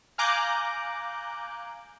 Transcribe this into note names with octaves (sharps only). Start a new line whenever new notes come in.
F5 G#5 A#5 D6 F#6 G6